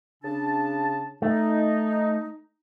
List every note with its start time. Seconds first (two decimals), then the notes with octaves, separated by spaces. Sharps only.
0.22 C#3 D4 A5
1.22 A3 D#4